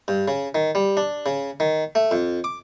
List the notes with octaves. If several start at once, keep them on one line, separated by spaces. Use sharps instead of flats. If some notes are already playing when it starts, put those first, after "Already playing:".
G2
C#3
D#3
G3
D4
C#3
D#3
A3
F2
D6